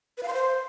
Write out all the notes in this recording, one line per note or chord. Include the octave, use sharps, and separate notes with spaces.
B4
F5
C6
C5